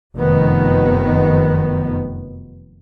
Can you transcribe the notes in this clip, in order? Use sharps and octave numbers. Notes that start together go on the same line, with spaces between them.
F1 F#2 D#3 B3